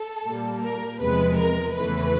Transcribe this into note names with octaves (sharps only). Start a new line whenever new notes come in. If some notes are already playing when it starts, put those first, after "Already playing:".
Already playing: A4
A#2 G3 A#3
A#4
E2 C3 F3 G#3 B4
A#4
E2 C#3 E3 A3 B4